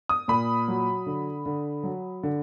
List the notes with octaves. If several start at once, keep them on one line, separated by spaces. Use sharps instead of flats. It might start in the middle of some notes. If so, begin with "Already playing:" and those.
D#6
A#2 B5
F#3
D3
D3
F#3
D3